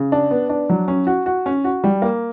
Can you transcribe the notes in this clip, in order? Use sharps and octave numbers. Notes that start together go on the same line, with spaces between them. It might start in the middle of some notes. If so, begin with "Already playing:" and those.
Already playing: C#3
D4
B3
D4
F#3
C#4
F#4
F#4
C#4
F#4
G3
A#3